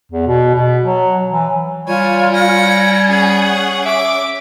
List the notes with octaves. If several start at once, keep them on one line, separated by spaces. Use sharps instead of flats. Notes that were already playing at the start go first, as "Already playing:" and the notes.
E2
B2
B2
F#3
E3
G3 F4 C#5 G#5
G#5 A#6 C#7
C#4 G#4 F#5
E5 D6